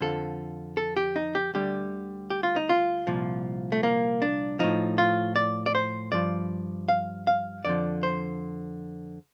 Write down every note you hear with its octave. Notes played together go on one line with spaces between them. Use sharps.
F2 D3 F3 A4
A4
G4
D#4
G4
D2 D3 G3 G4
G4
F4
D#4
F4
C2 A#2 F3
A3
A#3
D4
A2 F3 D#4
F4
D5
D5
C5
G2 F3 D5
F5
F5
F2 D3 F3 D5
C5